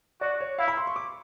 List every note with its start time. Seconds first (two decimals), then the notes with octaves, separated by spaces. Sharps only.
0.21 F#4 D5
0.40 C#5
0.58 E4 F5
0.68 B5
0.77 C6
0.87 C#6
0.96 D6